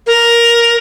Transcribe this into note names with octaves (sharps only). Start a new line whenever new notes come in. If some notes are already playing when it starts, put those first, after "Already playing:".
A#4